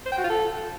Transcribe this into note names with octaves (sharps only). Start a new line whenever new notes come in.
C5
G5
F#4
F4
A4